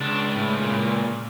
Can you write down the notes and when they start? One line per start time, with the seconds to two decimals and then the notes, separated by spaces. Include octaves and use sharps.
0.01 C#2 D4
0.36 A2
0.62 A#2